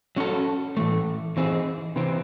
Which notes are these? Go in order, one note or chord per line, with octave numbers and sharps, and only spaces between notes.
F#3 C#4 F#4 A4
A2 E3 A3
E3 C4 D#4 G#4
C3 E3 C4